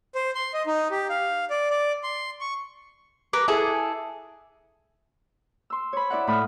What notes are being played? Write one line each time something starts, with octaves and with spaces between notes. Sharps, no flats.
C5
C6
D#5
D#4
G4
F5
D5
D5
C6
C#6
A#4 B4 D6
E4 G#4 A4
C6 E6
C#5 B5
E4 D5 E5 F#5
A2 B5 D#6 F6